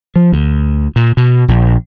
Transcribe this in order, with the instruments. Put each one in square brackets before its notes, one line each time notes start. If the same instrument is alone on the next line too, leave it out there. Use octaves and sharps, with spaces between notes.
[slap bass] F3
D2
A#2
B2
A#1